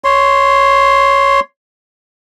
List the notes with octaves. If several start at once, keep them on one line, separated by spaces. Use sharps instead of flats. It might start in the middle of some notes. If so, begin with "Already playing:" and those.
C#5 C6